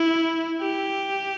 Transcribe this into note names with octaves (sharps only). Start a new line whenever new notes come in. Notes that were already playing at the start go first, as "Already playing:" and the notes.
Already playing: E4
G4